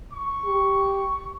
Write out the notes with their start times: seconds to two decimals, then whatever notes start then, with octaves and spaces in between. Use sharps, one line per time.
0.12 C#6
0.45 G4